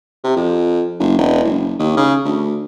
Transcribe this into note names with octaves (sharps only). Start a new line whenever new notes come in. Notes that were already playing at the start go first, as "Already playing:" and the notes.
C3
F2
F#1
E1
F#1
D#2
C#3
D2